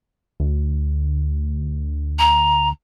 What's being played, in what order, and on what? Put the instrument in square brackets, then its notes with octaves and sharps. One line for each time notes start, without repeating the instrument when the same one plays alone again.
[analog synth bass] D2
[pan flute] A#5